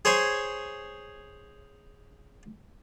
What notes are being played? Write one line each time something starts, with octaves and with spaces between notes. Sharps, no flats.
G#4 C5 C#5 G#5